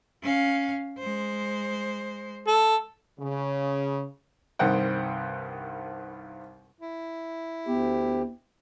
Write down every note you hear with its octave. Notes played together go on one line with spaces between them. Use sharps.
C#4 F5
G#3 C5
A4
C#3
C2 G2 D#3 C4 F#5 G5
E4
D2 B3 G4